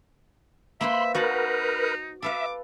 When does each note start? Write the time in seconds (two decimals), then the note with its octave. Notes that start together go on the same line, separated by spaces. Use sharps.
0.81 A#3 B4 C5 E5 B5 C6
1.15 D#4 F#4 A#4 B4 F#5 A5
2.22 A4 B4 E5 F5 D6